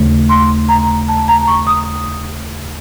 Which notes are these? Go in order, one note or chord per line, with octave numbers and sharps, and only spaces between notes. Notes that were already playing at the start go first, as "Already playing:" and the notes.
Already playing: D#2 C#3 A3
C6
A#5
A5
A#5
C#6
D#6